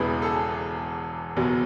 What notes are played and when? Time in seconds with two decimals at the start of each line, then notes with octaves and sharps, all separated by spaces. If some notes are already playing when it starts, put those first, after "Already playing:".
Already playing: E1 E2 C#3 E3 G#4 B4
0.22 A4
0.25 G#4
1.37 F#1 E2 B2 F#3